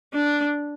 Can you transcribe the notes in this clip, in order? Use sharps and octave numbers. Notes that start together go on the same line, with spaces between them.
D4